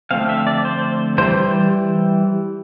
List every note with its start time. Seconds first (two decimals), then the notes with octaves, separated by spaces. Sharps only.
0.11 D3 F3 A3 C4 F5
0.29 E5
0.47 D5
0.65 C5
1.18 E3 G3 C5